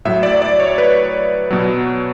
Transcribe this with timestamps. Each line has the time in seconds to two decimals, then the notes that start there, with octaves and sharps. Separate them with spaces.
0.05 A2 F#3 E5
0.23 D5
0.42 D5
0.60 C#5
0.78 B4
1.51 B2 F#3